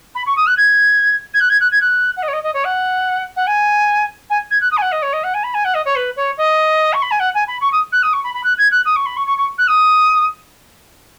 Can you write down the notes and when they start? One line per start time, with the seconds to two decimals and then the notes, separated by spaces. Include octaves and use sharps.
0.15 B5
0.26 C#6
0.36 D#6
0.46 F#6
0.57 G#6
1.33 G#6
1.40 F#6
1.49 G#6
1.60 F#6
1.71 G#6
1.81 F#6
2.16 F#5
2.22 D#5
2.28 C#5
2.33 D#5
2.43 D#5
2.53 C#5
2.64 F#5
3.36 F#5
3.47 G#5
4.30 G#5
4.50 G#6
4.61 F#6
4.71 D#6
4.77 G#5
4.82 F#5
4.92 D#5
5.02 C#5
5.13 D#5
5.23 F#5
5.34 G#5
5.43 B5
5.54 G#5
5.64 F#5
5.74 D#5
5.85 C#5
5.95 B4
6.16 C#5
6.37 D#5
6.93 C#6
7.02 B5
7.11 G#5
7.19 F#5
7.34 G#5
7.47 B5
7.61 C#6
7.72 D#6
7.92 F#6
8.02 D#6
8.13 C#6
8.23 B5
8.34 B5
8.43 F#6
8.58 G#6
8.71 F#6
8.85 D#6
8.96 C#6
9.06 B5
9.16 C#6
9.26 C#6
9.37 C#6
9.58 F#6
9.68 D#6